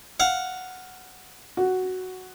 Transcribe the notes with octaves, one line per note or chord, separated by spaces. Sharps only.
F5 F#5
F#4